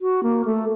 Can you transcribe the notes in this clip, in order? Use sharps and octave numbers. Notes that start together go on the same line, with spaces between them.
F#4
A#3
A3